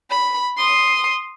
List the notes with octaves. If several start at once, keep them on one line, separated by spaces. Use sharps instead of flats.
B5
C6 D#6